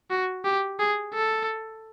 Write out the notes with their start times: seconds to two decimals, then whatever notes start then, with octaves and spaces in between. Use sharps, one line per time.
0.10 F#4
0.45 G4
0.80 G#4
1.14 A4